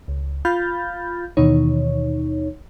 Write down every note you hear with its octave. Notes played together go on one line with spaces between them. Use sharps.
C#2
F4 F5 B5 F6 G6 A6
D#2 B2 D#3 E3 D#4 C#5